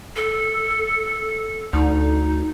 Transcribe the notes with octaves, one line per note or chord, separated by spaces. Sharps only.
A4
D2 D#4